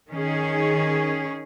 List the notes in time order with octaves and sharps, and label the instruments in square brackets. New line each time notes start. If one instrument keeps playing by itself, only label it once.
[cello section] D#3 C#4 G#4